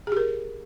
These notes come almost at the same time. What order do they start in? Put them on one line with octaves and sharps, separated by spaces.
G#4 G4 A#4